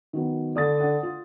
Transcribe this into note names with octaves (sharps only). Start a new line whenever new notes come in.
D#3 F#3 B3
D3 D5 D#6 A6
D4 F#5
F4